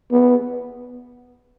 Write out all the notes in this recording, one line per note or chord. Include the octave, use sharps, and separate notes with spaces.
B3